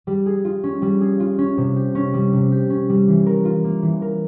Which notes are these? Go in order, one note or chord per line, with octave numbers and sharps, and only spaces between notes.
G3
G#4
F4
C#4
G3
G#4
F4
C#4
C3
G4
C#4
G3
C3
G4
C#4
G3
E3
A#4
F4
A#3
E3
A#4